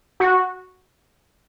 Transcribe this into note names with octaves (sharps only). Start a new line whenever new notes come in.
F#4